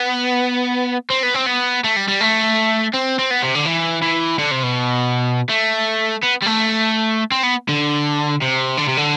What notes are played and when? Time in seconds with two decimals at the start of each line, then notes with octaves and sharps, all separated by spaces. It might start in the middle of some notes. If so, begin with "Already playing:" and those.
Already playing: B3
1.10 C4
1.23 B3
1.34 C4
1.47 B3
1.84 A3
1.96 G3
2.08 G3
2.20 A3
2.94 C4
3.19 C4
3.30 B3
3.43 C3
3.55 D3
3.66 E3
4.02 E3
4.39 D3
4.51 C3
4.63 B2
5.49 A3
6.23 B3
6.42 G3
6.46 A3
7.32 C4
7.43 B3
7.69 D3
8.42 C3
8.77 D3
8.88 C3
8.97 D3